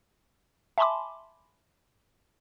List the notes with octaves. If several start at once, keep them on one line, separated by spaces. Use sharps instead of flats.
E5 G#5 A5 B5 C6 D6